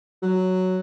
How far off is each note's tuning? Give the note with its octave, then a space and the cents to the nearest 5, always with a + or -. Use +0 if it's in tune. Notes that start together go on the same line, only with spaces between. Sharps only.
F#3 +0